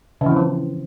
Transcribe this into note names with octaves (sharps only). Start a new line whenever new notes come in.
C#3
E3
C4
F3